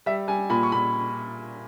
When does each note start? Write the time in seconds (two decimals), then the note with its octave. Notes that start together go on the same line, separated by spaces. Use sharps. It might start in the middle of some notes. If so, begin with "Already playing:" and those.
0.06 G3 E5
0.28 G3 G#5
0.50 A#2 B5
0.63 C#6
0.72 A#2 B5